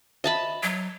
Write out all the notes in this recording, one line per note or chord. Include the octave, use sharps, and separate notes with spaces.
C5 D#5 E5 A5 B5
F#3